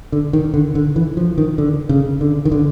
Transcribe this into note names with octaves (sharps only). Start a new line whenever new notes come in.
D3
D#3
D3
D3
E3
F3
D#3
D3
C#3
D3
D#3
D3